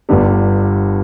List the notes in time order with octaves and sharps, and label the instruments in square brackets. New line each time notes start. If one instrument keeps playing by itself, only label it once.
[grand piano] G1 G2 D3 G3